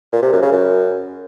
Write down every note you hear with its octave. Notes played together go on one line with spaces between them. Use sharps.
A#2
C3
F#2
C#3
F#2